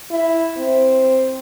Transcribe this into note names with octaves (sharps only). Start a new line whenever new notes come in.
E4
C4